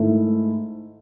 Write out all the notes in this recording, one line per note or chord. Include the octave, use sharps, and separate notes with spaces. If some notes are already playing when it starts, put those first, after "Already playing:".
Already playing: G#2 D#3 A3 E4